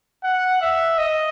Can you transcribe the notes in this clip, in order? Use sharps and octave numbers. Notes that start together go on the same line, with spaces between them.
F#5
E5
D#5